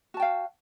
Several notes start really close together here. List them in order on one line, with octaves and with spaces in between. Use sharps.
F#4 A5 G5 F5